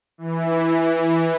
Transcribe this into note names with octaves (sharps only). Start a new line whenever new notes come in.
E3